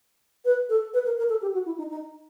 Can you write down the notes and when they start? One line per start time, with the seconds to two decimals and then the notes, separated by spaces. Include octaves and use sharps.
0.45 B4
0.69 A4
0.94 B4
1.06 A#4
1.18 A#4
1.29 A4
1.42 G4
1.53 F#4
1.66 E4
1.78 D#4
1.90 D#4